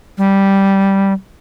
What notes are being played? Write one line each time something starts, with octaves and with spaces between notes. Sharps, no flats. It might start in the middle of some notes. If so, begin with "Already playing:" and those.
G3